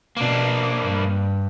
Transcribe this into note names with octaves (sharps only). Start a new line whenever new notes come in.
B2 A#3 D4
G2